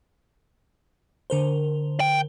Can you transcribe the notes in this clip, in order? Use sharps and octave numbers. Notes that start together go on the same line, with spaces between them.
D3 A#4 C5
G5